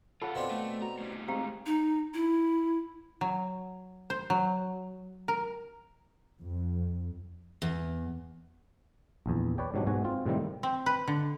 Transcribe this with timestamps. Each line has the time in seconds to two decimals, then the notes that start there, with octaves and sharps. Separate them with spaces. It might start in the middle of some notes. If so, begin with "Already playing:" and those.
0.22 F4 A4 C#5 F5 F#5 B5
0.35 B2 C4 D4
0.51 A3
0.82 F#4 A#5
0.99 A2 G3
1.28 G#3 C4 G4 F5 A#5
1.66 D#4
2.14 E4
3.21 F#3
4.10 C5
4.30 F#3
5.28 A#4
6.40 F2
7.62 E2
9.26 A#1 E2
9.58 B4 C#5 D5 G5
9.74 G#2 B2 F#3 G3 D4
9.87 G#2 B2 F#4 G#5
10.04 C4 F4
10.26 A2 C3 D#3 G3 C4
10.63 C4
10.86 B4
11.08 D3